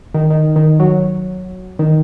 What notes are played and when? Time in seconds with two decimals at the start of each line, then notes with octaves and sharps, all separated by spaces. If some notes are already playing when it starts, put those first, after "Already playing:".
0.14 D#3
0.30 D#3
0.56 D#3
0.80 F#3
1.79 D#3